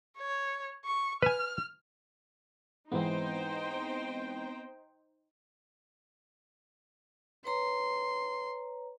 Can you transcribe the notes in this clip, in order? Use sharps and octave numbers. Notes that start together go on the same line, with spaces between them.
C#5
C#6
B4 G#5 F6
G#2 E3 B3 C4 D#4 C5 G5
B4 C#5 A#5 C6